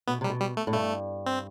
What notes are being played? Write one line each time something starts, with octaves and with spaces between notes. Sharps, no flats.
B2 B3
C3
G3
B2
G3
A3
A2
G2 A3
C4